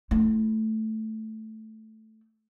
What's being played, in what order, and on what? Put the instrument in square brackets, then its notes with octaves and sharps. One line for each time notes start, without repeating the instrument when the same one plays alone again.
[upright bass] A3 E4